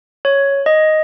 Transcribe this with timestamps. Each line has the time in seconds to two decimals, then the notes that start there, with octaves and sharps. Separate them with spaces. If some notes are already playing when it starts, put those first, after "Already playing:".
0.25 C#5
0.66 D#5